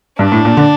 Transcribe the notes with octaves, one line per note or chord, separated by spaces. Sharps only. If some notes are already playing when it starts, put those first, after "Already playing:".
G2 D4
A2
A#2
D3